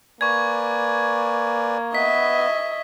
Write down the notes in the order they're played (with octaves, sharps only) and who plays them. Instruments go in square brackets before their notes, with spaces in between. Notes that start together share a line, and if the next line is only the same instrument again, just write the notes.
[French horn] A#3 [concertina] B4 D5 G#5 [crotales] C#6 G#6
[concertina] B3 B4 [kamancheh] D#5 E5 [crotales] B6